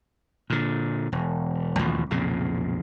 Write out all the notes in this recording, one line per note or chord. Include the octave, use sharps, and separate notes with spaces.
A#2 D3
E1
A1 D#2 B2 F3
B1 F2 A#2 C#3